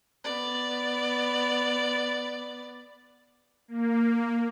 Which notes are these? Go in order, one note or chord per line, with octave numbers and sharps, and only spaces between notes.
B3 D5
A#3